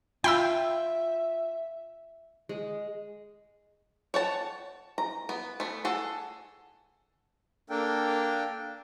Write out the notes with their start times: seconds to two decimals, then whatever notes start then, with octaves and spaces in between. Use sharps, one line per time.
0.24 F4 E5 G5 B5 E6
2.49 G#3
4.14 C#5 F#5 A5
4.98 A#5
5.29 B3
5.60 A3 B3
5.85 G#4 A4 F#5
7.70 A#3 D4 A4 A#4 G5